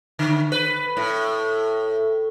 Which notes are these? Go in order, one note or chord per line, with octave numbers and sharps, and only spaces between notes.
D3
B4
A2